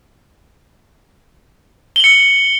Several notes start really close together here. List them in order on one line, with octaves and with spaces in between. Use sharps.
G7 F#7 C#7